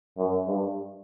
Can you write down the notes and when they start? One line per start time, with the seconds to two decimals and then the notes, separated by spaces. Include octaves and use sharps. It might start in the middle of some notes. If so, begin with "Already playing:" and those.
0.18 F#2
0.47 G2